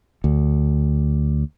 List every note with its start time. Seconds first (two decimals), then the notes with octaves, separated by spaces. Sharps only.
0.24 D2